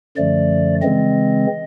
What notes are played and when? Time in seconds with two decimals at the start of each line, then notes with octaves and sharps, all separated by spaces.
0.17 F#2 D3 F3 A3 D5
0.82 C#3 E3 G#3 C4 D#5